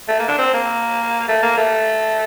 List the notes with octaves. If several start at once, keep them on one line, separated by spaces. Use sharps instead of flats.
A3
A#3
D4
C4
A#3
A3
A#3
A3